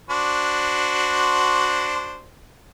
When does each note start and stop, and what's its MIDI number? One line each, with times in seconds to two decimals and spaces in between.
0.10 2.26 62
0.10 2.26 66
0.10 2.26 72